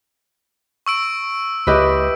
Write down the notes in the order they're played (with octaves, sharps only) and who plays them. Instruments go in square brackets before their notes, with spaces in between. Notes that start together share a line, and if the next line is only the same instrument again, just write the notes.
[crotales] C#6 E6 D7
[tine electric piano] C#2 D#5 [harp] E4 G4 B4